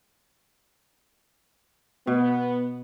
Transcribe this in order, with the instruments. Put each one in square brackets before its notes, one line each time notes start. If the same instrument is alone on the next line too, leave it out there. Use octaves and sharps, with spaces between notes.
[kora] B2 [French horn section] B3